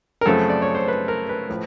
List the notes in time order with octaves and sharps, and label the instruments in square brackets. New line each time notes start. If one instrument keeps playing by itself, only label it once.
[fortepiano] A#4
F#2 C#3 F3 A3 C4 A4
D5
C#5
C5
B4
A#4
B4
A2 F3